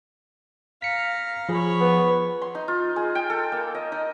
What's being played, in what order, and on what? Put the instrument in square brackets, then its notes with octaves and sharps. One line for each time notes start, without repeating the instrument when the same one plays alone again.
[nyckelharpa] F5 A#5 [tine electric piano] B6 C#7
[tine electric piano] F3 G#4 [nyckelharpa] C#5 B5
[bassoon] B3
[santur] C6
D#4
F4
G#4
G5
A4
A#3
D#5
D#4